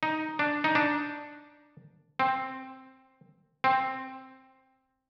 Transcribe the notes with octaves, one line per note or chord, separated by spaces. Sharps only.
D#4
D4
D#4
D4
C4
C4